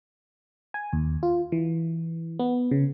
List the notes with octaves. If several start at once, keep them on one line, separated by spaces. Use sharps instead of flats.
G#5
D#2
F4
E3
B3
C#3